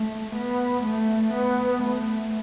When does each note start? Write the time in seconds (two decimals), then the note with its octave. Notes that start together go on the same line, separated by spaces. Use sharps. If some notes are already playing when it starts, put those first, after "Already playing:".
Already playing: A3
0.35 B3
0.84 A3
1.34 B3
1.84 A3